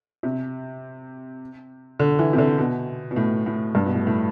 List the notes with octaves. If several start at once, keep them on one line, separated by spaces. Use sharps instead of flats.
C3
D3
E3
C3
D3
B2
B2
A2
A2
G2
B2
A2
A2